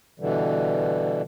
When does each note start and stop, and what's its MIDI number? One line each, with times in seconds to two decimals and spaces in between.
0.20 1.22 47
0.20 1.22 50
0.20 1.22 52
0.20 1.22 55